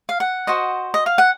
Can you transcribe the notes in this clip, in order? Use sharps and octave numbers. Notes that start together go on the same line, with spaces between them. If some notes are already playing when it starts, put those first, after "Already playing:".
F5
F#5
F#4 C5 D#5
D#5
F5
F#5